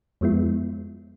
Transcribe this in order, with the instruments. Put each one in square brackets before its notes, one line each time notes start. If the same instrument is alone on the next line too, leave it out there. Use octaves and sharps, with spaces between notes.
[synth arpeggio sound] F2 F3 G#3 B3 E4